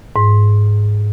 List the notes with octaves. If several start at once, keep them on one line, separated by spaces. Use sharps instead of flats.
G#2